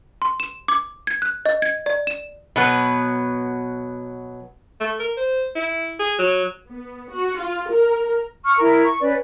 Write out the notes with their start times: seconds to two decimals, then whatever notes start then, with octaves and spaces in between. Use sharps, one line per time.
0.22 C6
0.40 E7
0.68 D6
1.07 G#6
1.22 F#6
1.45 D#5
1.62 G#6
1.86 D5
2.07 E7
2.56 B2 F#3 B3
4.80 A3
5.00 A#4
5.17 C5
5.55 E4
5.99 G#4
6.19 F#3
6.69 B3
7.11 F#4
7.39 F4
7.70 A#4
8.45 C#6 E6 F6
8.59 E4 A#4
8.83 C#6
9.01 C#4 B4 D5